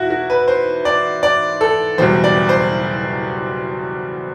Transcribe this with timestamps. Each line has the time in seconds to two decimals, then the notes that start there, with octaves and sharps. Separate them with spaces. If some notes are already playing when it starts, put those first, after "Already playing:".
Already playing: E2 B2 E4 F#4
0.10 F#4
0.30 B4
0.48 C5
0.85 D5
1.23 D5
1.61 A4
1.98 F#1 E2 B2 G3 C5
2.24 D5
2.49 C5